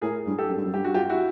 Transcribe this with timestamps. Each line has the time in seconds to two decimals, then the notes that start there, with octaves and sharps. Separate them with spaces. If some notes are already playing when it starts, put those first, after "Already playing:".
0.01 A2 G#4 A#4
0.27 G2
0.38 G4 A4
0.50 F#2
0.57 G2
0.65 F#2
0.74 G2 G4
0.84 F#4
0.94 F4 G4
1.10 E4 F#4